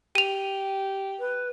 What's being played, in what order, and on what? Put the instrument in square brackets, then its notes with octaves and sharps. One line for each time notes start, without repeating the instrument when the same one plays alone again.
[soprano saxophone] G4 [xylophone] D#7 F7
[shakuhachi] B4